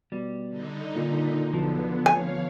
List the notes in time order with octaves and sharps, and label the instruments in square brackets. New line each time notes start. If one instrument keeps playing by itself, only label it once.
[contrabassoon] B2 [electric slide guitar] G3
[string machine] D3 D#4
[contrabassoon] A#2
[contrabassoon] B1 [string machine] D3 B3 [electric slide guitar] F3
[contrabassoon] D1 [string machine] C#5 F5 [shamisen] G#5